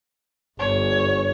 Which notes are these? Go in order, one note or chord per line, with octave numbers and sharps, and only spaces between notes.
G1 C#5